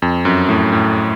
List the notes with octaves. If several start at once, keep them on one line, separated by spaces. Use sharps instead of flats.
F2
F#2
A2
A2